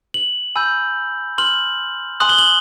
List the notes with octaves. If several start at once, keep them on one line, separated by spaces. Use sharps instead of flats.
F#7
G#5 B5 E6 G6
C6 F6 F#7
G#5 C6 D#6 F#6 F#7
G7
F#7